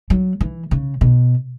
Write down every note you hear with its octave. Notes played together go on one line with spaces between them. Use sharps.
F#3
E3
C#3
B2